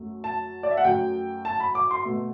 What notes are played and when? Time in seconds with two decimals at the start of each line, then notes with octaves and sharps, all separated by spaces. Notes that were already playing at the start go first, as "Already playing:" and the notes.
Already playing: F#2 F#3 A3
0.24 A5
0.63 D5
0.71 E5
0.77 F#5
0.84 F#2 F#3 A3 G5
1.45 A5
1.60 B5
1.75 D6
1.91 C6
2.05 B2 A3